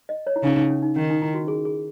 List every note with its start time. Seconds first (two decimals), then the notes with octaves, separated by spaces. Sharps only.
0.09 D#5
0.27 C#5
0.36 E4
0.43 C#3 D#4
0.57 D#4
0.70 C#4
0.82 D#4
0.96 D#3 C#4
1.09 D#4
1.22 E4
1.34 F#4
1.48 G#4
1.65 G#4